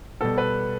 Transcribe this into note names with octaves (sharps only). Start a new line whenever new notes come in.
B2 G3 A4
B4